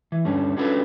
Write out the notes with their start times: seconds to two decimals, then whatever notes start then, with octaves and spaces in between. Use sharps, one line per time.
0.12 E3
0.25 D2 G2 D3 G3 C#4
0.57 C#4 D4 F4 F#4 A4 B4